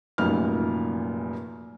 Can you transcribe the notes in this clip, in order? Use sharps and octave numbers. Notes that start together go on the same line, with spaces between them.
F1 F#2 A#2 D#4 F6